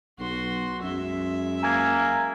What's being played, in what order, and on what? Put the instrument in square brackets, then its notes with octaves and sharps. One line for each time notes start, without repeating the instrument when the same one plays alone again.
[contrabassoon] B1 [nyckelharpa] F#4 C6
[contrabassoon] F#2 [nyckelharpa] G#3 E5
[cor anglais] A#3 [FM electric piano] G#5 A#5 G#6